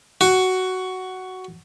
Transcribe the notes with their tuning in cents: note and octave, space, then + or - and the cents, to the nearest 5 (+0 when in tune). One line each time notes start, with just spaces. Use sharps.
F#4 +10